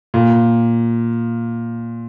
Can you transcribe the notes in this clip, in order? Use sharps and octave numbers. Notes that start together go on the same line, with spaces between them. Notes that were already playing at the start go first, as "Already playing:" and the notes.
A#2